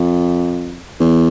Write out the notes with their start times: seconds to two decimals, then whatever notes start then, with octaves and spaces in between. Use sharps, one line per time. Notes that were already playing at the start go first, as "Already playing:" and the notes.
Already playing: F2
1.00 E2